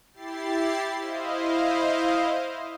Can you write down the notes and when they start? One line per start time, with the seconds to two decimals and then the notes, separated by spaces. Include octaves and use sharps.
0.12 E4 G4 A6 C7
0.99 E4 C5 D#5 F5